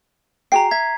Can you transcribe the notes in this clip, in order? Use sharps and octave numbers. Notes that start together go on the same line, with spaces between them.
F#4 G#4 G5 A#5 C7
E5 G#6 B6